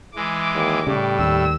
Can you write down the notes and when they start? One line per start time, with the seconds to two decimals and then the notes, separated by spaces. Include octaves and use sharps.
0.16 E3 G#3 D6
0.55 D#2
0.87 A2 C#3 G3
1.19 D#2 E6